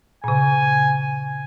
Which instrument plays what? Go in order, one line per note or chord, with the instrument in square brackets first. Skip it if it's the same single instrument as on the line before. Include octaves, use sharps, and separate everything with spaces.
[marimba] A#2 C#3 [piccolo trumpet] G#5